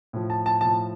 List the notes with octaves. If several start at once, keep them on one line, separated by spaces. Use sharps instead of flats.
A2 F3
A5
A5
A2 F3 A5